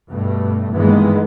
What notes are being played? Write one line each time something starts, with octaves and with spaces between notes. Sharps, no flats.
G2 B2 A3
G2 D#3 E3 G#3 A#3 B3